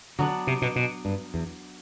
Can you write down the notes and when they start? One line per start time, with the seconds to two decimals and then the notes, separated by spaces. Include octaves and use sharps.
0.19 D3 F#3 B3 D4
0.47 C3
0.62 B2
0.76 B2
1.05 G2
1.34 E2